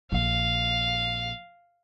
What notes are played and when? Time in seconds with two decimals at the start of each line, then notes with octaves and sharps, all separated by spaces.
0.12 A#1 F5